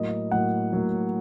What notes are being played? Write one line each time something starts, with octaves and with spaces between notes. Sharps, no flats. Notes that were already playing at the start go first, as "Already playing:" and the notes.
Already playing: A2 F#3 A#3 D#5
A2 F#3 A#3 F#5
A2 F#3 A#3